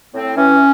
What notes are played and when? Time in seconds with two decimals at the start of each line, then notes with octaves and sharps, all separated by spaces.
0.14 A2 C4
0.36 E3 C#4